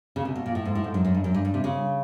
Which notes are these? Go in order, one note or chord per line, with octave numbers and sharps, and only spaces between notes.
C#3
C3
B2
A#2
A2
G#2
A2
G#2
F#2
F#2
G2
F#2
G2
G2
C3
C#3